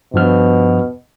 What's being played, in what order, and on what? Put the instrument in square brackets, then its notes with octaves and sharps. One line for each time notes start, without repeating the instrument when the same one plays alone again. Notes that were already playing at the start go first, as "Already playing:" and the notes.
[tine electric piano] G2 F3 F6 [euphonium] B2